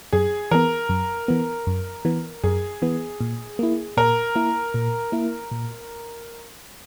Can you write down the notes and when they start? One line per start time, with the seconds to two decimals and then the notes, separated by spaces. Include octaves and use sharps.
0.13 F#2 G#4
0.51 E3 B3 A#4
0.89 F#2
1.28 E3 B3
1.67 F#2
2.05 E3 B3
2.44 F#2 G#4
2.82 E3 B3
3.21 A#2
3.59 A#3 E4
3.97 A#2 A#4
4.36 A#3 E4
4.74 A#2
5.12 A#3 E4
5.51 A#2